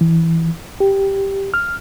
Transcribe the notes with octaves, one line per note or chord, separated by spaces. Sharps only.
E3
G4
F6